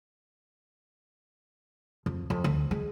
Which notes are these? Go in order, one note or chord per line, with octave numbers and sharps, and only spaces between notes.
F2
F2
D2
G#3